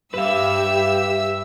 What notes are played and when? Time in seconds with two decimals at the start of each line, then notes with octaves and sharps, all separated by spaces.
0.14 G2 G4 B4 E5 F5 E6